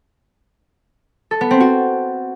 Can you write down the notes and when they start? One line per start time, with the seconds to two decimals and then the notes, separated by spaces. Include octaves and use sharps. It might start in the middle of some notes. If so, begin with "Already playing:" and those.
1.31 A4
1.41 B3
1.51 C4
1.60 F#4